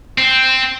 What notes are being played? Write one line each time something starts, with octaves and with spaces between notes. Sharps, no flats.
C4